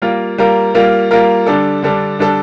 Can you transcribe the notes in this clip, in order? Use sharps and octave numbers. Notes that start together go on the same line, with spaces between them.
G3 A#3 F4 A#4
G3 A#3 F4 A#4
G3 A#3 F4 A#4
G3 A#3 F4 A#4
D3 G3 D4 A4
D3 G3 D4 A4
D3 G3 D4 A4